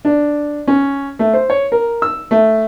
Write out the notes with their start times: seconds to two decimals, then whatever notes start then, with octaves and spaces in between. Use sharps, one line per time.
0.05 D4
0.68 C#4
1.19 A3
1.34 C5
1.50 C#5
1.72 A#4
2.02 E6
2.31 A3